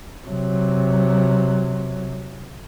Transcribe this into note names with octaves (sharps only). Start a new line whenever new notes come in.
C3 F#3